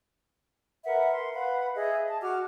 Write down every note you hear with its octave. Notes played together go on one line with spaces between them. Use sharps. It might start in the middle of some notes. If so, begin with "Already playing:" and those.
A#4 B4 E5 F#5
C6
B4 F5 F#5 B5
G#4 D#5 E5
A5
F#4 D6 F6